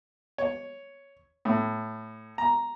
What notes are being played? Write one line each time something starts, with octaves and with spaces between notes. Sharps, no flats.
C#5
A2
A#5